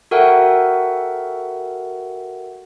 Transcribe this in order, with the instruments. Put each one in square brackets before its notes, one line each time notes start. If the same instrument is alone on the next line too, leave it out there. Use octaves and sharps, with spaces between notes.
[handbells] F#4 A4 A#4 E5 F#5 G5